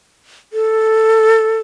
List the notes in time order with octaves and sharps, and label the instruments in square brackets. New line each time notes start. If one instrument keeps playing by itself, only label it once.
[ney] A4